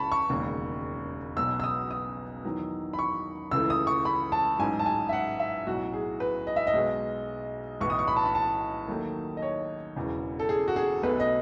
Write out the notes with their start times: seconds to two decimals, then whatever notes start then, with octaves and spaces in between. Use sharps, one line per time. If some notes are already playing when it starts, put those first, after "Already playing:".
Already playing: C#2 C#3 E3 A5 B5 C#6
0.12 C#6
0.29 E1 D#2 C#3
1.37 B1 B2 F#3 B3 E6
1.60 E6
1.64 D#6
1.91 D#6
2.45 E2 D#3 F#3
2.93 B5
2.99 C#6
3.51 C#2 C#3 E3 A3 E6
3.70 D#6
3.87 C#6
4.05 B5
4.32 A5
4.58 A1 G#2 F#3 G#5
4.79 A5
4.86 G#5
5.09 E5
5.13 F#5
5.39 E5
5.67 B1 A2 F#3 F#4
5.93 G#4
6.20 B4
6.47 D#5
6.56 E5
6.67 D#5
6.73 B1 B2 G#3
7.81 B1 A2 E3 B3 C#6
7.90 D#6
7.99 C#6
8.08 B5
8.16 A5
8.25 B5
8.35 A5
8.88 D#2 D#3 F#3 A3
9.37 D#5
9.42 C#5
9.96 E1 E2 C#3
10.39 A4
10.49 G#4
10.68 F#4
10.76 G#4
11.03 B1 B2 A3 B4
11.20 D#5